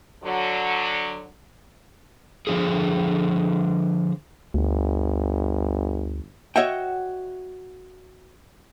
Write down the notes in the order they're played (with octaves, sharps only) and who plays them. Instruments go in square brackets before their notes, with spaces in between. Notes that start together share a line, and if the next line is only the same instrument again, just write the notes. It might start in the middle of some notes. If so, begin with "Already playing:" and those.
[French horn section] D3 F#3
[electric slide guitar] D3 F3 E4 G#4
[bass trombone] G1 [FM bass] D2
[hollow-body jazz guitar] F#4 C#5 D#5 E5 F#5 G5